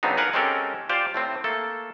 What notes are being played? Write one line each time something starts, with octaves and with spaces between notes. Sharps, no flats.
C#3 F#3 B3 C4 D4 D#4
A#4 B4 F5 F#5 G#5
G#3 C4 C#4 G4 A4 A#4
F4 G4 C5 D5 F5
A2 A3 C4
A3 A#3 A4